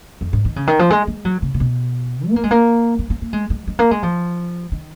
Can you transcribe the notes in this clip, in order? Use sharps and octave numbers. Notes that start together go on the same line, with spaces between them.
F2
G#2
D#3
C#3
D#3
F3
G#3
G#3
F#3
C#3
C#3
B2
B3
A#3
G#3
A#3
A#3
A#3
A#3
G#3
G#3
G#3
A#3
G#3
F3
D#3